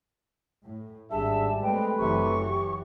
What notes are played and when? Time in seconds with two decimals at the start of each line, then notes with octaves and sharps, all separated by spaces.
0.64 A2
1.11 G#1 G3 D4 G#4 E5 A5
1.63 G#3 A3 C4 B4 G5
1.99 F#1 C3 E3 F#3 C#6
2.50 G4